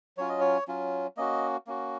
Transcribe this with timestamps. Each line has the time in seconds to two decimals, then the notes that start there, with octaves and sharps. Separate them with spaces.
0.17 F#3 C#4 F4 C#5
0.29 D#5
0.41 C#5
0.68 F#3 C#4 F4
1.17 A#3 C#4 F#4 D#5
1.67 A#3 C#4 F#4